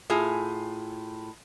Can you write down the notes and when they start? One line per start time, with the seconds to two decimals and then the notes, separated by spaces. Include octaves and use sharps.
0.10 A2 F4 G#4 G#5